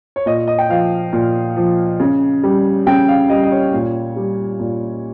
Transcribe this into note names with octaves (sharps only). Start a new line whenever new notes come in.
C#5
A#2 D#5
D#5
G5
F3 F5
A#2
F3
C#3
G3
C#3 G5
F5
G3 D#5
D#5
C#5
A#2
G3
A#2